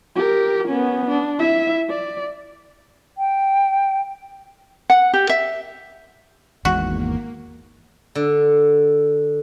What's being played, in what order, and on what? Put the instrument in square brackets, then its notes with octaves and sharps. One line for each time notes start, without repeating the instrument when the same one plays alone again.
[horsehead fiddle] G4 A#4
B3 C#4
D4
E4 E5
D5
[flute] G5
[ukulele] F#5
G4
E5
[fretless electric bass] G#1 E2 G#2 [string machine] A#3 [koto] F#4
[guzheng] D3